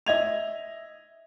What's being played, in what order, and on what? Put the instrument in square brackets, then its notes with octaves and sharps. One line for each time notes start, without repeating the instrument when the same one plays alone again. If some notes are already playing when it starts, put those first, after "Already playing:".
[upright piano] D#5 E5 G#6 F7